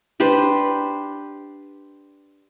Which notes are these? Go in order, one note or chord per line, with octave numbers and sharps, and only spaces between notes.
D4 G4 B4 C5